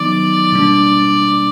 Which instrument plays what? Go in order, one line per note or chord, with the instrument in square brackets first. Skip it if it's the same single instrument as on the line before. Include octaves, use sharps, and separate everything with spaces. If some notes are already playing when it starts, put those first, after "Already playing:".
Already playing: [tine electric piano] D#3 F#3 B3 D#4 [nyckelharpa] D5
[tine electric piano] B2 G3 A#3 D4